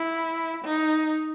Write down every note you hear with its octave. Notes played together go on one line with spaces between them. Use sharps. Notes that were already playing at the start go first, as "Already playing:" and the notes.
Already playing: E4
D#4